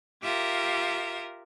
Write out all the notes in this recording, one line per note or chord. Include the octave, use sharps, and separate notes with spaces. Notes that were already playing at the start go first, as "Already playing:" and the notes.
F4 G4 A#4 E5